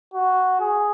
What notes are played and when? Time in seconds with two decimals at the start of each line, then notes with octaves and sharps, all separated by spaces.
0.14 F#4
0.60 G#4